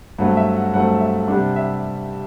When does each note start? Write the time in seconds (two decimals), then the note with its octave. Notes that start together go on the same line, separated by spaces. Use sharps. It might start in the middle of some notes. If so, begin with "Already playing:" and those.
0.18 G2 F#3 A3 C4 F#5
0.37 E5
0.55 F#5
0.74 G2 F#3 A3 C4 F#5
1.01 E5
1.28 C3 G3 D4 F#5
1.56 E5